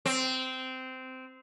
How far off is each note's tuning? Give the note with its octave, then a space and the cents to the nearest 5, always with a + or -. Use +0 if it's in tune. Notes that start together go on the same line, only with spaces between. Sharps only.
C4 -15